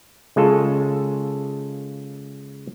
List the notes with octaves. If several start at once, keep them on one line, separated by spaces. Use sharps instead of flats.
C#3 G#3 F4 A4